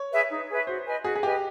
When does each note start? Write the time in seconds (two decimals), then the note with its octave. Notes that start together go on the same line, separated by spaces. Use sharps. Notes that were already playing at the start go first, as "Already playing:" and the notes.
Already playing: C#5
0.11 G#4 B4 E5
0.30 D#4
0.48 G#4 B4 E5
0.67 F#4 C5
0.85 B4 D#5 G#5
1.04 F#4 G#4
1.16 G#4
1.23 G4 B4 D#5 G#5